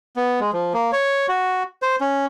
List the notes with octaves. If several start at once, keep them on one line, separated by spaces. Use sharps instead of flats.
B3
G#3
F3
A#3
C#5
F#4
C5
C#4